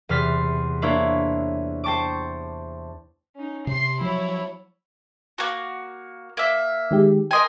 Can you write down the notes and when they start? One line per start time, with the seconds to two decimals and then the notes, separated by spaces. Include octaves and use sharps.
0.09 E2 C3 C6 F6 A6 B6
0.82 A#3 D4 E4 C5 C#5
1.84 C5 G5 A5 C#6 D6
3.36 C#4 D#4
3.67 C3 C6 C7
4.01 F3 F#3 E4 C#5
5.38 A#3 F#4
6.37 A#3 E5
6.91 D#3 G#3 G4
7.31 A#4 D#5 G5 G#5 C6 D#6